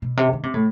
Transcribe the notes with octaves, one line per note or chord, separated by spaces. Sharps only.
B2
C3
D#3
C3
A2